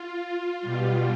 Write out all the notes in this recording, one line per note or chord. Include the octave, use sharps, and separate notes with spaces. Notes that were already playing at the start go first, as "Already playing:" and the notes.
Already playing: F4
B2 G3